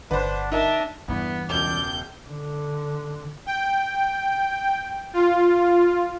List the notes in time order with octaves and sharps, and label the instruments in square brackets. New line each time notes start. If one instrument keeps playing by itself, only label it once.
[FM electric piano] G1 D3 F#5 [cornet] D4 [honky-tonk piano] B4 C5
[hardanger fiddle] D4 [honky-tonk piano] D#4 A#4 [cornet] E5
[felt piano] E2 E4 [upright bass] G2 E3 [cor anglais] B3
[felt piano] E1 C#2 [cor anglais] D5 [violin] G6
[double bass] D3
[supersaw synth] G5
F4